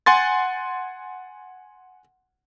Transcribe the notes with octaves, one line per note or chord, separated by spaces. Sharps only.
F#5 G#5 C6 A6